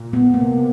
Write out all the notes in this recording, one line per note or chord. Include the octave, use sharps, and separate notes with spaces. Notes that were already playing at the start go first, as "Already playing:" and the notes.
Already playing: A#2
B3
C3 A#3